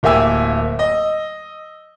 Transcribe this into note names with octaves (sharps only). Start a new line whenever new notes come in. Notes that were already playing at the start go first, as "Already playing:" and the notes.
D1 A#3 G4 E5 G#5 E6
D#5